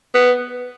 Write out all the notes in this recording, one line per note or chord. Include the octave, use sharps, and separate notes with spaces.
B3